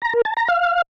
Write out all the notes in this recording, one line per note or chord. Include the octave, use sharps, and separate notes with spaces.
A#5
A#4
A5
A#5
F5